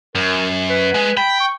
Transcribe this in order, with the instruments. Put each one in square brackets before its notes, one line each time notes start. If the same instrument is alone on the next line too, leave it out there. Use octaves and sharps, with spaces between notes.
[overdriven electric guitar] F#2 [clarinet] A#4
[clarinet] B4
[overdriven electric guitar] G#3
[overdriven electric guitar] G5 [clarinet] B5
[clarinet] C#6